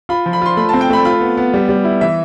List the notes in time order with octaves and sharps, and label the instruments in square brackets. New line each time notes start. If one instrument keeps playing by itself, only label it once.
[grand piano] F4 [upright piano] B5
[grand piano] F3
[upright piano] B5
[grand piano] F4 [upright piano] C6
[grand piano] A3 [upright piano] B5
[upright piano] A5
[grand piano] C4
[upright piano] G5
[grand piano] A3 [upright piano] B5
[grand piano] F4 [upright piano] B5
[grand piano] B3
B3
G3
G3
E4
[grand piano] E3 [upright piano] E5